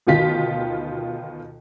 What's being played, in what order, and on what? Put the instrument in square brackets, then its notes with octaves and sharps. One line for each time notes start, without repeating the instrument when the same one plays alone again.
[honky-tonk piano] D2 B2 D#3 F4 B6